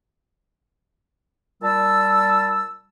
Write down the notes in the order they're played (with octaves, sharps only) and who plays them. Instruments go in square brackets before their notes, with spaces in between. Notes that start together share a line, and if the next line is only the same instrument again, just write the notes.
[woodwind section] A#2 G3 A5 E6